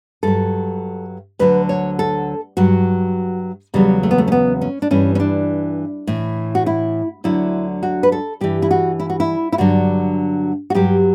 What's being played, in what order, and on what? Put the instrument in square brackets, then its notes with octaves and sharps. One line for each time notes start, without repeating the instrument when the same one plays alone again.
[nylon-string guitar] G2 F#3 A4
D2 D3 F#3 B4
C#5
A4
G2 F#3 F#4
E2 C#3 F#3 G3
A3
B3
A3
C#4
B3
C#4
D4
G2 E3 C#4
C#4
D4
A2 E3
F#4
E4
D2 D3 F#3 E4
F#4
B4
A4
G2 E3 G4
E4
F#4
E4
F#4
E4
E4
G2 D3 F#3 F#4
F#4
G2 F#3 G4